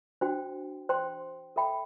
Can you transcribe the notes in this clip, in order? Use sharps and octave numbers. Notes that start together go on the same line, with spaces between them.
D4 F#4 C5 G5
C5 G5 C6
A4 E5 G5 B5